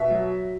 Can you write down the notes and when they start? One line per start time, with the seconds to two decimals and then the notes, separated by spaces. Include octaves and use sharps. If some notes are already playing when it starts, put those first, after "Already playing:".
Already playing: B2 E5
0.10 F#3